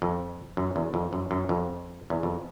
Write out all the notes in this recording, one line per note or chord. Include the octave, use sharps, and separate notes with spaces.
F2
F#2
E2
F2
F#2
F#2
F2
E2
F2